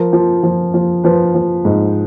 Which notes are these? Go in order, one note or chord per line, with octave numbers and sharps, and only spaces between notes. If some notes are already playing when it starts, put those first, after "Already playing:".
Already playing: F3 A#4
F3
F3
F3
F3 B4
F3
G#2